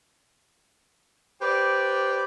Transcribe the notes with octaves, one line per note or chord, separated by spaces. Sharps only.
G4 B4 C5 D5 G5